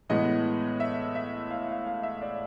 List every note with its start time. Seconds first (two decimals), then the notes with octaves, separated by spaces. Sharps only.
0.09 A2 E3 G#3 B3 D#5
0.80 E5
1.15 E5
1.50 F5
1.69 F5
1.86 F5
2.03 E5
2.21 D5